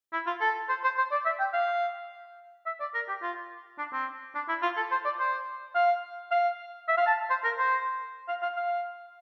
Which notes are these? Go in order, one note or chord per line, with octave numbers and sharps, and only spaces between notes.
E4
F4
A4
C5
C5
C5
D5
E5
G5
F5
E5
D5
A#4
G4
F4
D4
C4
D4
E4
F4
A4
C5
D5
C5
F5
F5
E5
F5
A5
C5
A#4
C5
F5
F5
F5